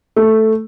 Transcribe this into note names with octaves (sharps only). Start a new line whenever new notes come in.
A3